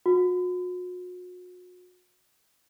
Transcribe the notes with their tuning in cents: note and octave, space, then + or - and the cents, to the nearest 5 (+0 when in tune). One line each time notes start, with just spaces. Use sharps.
F#4 -40